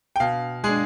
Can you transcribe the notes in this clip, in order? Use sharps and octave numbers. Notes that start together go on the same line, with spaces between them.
G5
B2 F5
G#3 D4 G#4